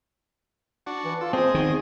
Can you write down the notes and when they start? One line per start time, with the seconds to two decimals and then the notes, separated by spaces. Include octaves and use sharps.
0.86 D4 F#4
1.05 E3
1.21 F4 A4
1.33 C4 G#4 C5 D#5
1.55 E2 D#3